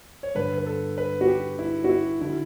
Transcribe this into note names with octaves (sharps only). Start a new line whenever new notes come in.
C#5
G2 D3 B4
B4
A4
B4
F#4
G4
E4
F#4
E4
D3 E4